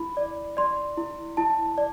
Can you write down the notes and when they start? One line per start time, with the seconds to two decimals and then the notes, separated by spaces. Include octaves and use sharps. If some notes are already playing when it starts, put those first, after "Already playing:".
Already playing: E4 B5
0.17 D5
0.57 D5 C6
0.97 E4
1.37 E4 A5
1.78 D5